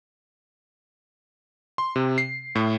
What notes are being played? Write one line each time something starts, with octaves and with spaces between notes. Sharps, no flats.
C6
C3
C7
A2